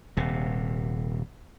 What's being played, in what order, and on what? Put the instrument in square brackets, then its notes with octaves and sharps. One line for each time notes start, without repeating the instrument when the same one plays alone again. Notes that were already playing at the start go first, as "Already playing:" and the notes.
[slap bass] D#1 C3